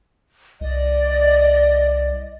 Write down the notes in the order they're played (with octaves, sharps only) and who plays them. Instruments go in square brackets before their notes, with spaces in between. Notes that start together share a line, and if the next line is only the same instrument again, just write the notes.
[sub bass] C2 [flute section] D5 [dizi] D#5